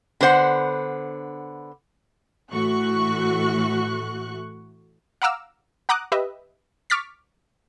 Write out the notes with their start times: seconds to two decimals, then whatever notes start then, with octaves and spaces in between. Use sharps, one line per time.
0.21 D3 B3 C5 F#5
2.52 A2 E3 A3 F#4 C#6 F#6
5.22 F5 F#5 A#5 D6 E6 F6
5.89 F#5 A#5 D6 D#6 F#6
6.12 G4 B4 D#5 E5
6.90 C#6 D6 F6 A6 B6